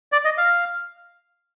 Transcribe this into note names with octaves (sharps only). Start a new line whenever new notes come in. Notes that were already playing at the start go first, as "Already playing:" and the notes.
D5
D#5
F5